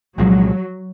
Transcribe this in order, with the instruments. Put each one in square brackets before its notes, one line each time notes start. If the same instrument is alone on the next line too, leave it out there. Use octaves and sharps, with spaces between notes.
[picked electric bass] C2 A#2 F3 G#3 [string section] F#3